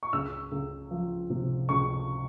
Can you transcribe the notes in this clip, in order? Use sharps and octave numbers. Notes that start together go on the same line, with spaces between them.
C#6
C#2 E6
C#2
F3
C3
C#2 C#6